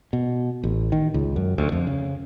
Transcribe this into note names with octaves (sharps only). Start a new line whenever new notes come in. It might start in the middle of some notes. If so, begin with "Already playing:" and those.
B2
A1
D#3
C#2
F#2
D2
F2
C#3